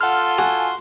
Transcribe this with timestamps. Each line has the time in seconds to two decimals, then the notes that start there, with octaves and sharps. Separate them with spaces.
0.01 F4 A4 F#5 C6 F6
0.38 F#4 G#5